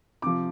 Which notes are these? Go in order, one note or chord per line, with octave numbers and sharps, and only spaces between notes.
C3 F3 D6